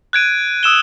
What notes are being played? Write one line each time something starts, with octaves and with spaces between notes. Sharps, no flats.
F#6 G#6 D7 D#7
D#6 E6 E7 G7